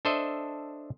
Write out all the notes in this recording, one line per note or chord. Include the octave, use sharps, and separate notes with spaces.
D4 A4 C5 D#5 E5